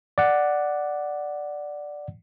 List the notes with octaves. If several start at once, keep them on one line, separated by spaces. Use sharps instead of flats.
D5 F#5